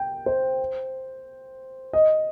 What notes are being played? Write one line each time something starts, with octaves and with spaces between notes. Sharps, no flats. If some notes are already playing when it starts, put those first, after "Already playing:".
Already playing: G5
C5
D#5